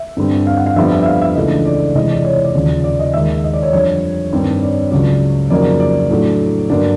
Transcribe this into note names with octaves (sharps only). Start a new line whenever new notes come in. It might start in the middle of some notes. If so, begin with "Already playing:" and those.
Already playing: E5
G2 D3 G3 C4
F5
F#5
F5
F2 D3 G3 B3 E5
E5
E5
F5
E5
C#2 C#3 E3 A3 D4 D#5
D5
C3 E3 G#3 D#5
D5
C#5
C#5
D5
D#2 C#3 F3
D5
D#5
D#2 D#3 G#3 E5
D#5
D5
C#5
F2 D3 G3 C#5
G2 D#3 G3 C4
D5
C#2 C#3 F#3 D5
F2 C#3 F#3 A#3 D#4 D5
D5
A2 F#3 A3 D4
G2 D3 F#3 A#3 D4 D5